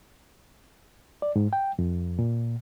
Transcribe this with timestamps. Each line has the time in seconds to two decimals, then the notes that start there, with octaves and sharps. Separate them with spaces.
1.22 D5
1.36 G#2
1.53 G5
1.79 F2
2.19 A#2